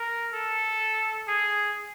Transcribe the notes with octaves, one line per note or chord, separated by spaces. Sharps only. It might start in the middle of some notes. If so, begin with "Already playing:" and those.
Already playing: A#4
A4
G#4